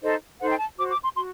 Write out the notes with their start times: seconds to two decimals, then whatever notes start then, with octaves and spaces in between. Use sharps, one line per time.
0.03 D#4 A4 C5 D#5
0.40 D#4 A4 C5 F#5
0.50 G5
0.59 A5
0.78 F#4 C5 D6
0.91 D6
1.03 C6
1.16 F#4 C6